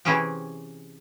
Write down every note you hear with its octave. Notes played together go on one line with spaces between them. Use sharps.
C3 E3 C4 C#4 G#4 G5